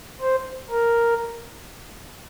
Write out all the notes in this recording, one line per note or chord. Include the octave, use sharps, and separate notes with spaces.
C5
A#4